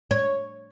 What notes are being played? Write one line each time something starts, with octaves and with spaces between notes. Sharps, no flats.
C#5